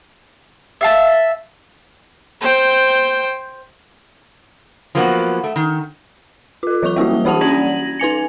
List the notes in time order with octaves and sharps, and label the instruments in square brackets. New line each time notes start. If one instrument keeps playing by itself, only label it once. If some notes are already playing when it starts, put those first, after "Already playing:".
[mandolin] E5 F5 A5
[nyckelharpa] C5 G5
[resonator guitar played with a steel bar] F3 F#3 A#3 B3 F4 F#4
A3
D#3
[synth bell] F4 A4
E3 F#3 C#6 F7 G7
G3 A#3 E4 F#4
E3 D4 F#4 F#5 A5 F7
C#4 D5 F#5 G#6 A#6 F#7
D#4 B4 G#5 C#7